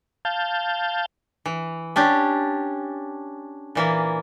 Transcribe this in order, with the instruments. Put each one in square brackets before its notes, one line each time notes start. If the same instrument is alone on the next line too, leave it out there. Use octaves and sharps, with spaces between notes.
[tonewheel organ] F5 A5 G6
[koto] E3
C#4 D4 G4
A#2 E3 A#3